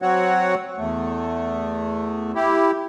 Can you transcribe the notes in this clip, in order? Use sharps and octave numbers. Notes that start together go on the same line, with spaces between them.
F#3 C4 F#4 C#5 F#5
E2 A3
E4 G4